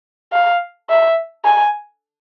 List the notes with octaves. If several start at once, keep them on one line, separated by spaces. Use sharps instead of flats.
F5
E5
G#5